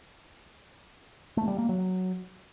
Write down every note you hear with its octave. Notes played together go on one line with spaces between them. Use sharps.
A3
G3
A#3
F#3